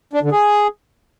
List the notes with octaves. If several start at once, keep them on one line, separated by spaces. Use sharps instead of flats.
D4
D3
G#4